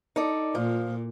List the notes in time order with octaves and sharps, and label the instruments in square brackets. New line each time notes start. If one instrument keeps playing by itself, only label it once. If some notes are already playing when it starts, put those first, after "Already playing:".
[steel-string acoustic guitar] D#4 A4 D5
[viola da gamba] A#2 [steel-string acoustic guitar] F3